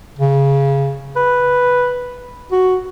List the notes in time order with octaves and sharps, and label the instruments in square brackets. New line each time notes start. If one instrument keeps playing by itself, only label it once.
[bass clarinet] C#3
B4
F#4